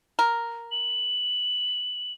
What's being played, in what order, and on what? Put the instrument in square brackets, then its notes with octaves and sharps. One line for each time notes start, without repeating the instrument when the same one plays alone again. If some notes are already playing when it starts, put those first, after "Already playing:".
[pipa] A#4
[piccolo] F#7